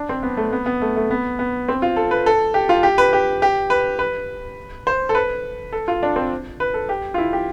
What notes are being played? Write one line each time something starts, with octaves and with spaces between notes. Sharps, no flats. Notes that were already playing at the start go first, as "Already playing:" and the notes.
Already playing: D4
C4
B3
A3
B3
B3
A3
A3
B3
B3
C4
F4
A4
B4
A4
G4
F4
G4
B4
G4
G4
B4
B4
C5
A4
B4
A4
F4
D4
C4
B4
A4
G4
F4
E4
G4